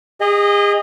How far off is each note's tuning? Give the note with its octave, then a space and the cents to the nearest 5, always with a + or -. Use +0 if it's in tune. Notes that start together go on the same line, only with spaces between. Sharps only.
G#4 -35 D#5 -5